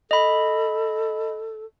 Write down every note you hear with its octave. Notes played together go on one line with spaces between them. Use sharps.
A4 D#5 B5